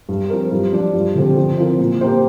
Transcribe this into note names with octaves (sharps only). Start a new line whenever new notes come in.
G2
F3 C4 A#4
G2
F3 D4 F4
G2
D3 F3 C4 G4
F3
C4 F4 A#4
A#2
A#3 G4 C5